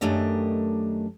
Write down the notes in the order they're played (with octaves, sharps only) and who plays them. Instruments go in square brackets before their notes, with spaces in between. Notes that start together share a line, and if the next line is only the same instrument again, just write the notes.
[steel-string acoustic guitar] F#2 D#3 A3 D4 G4 D#5